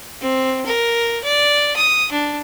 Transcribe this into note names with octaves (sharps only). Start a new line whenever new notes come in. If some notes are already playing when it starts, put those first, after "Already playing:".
C4
A#4
D5
D#6
D4